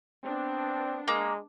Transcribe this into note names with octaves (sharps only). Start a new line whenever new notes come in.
B3 C4 D4
G#3 A#3